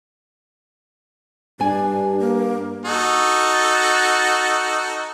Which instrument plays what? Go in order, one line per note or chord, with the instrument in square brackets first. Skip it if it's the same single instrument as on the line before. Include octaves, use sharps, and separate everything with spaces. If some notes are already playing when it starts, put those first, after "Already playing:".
[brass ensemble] G2 [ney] D4 [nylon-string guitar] D5 G#5
[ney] A#3
[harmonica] D#4 F#4 A4